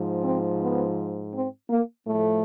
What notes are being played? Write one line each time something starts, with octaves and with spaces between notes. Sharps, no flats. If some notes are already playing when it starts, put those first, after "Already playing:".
Already playing: G#2 F3
C4
B3
C4
A#3
A2 F3 A3